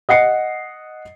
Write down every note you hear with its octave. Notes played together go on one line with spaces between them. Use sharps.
D#5 F#5 C7 C#7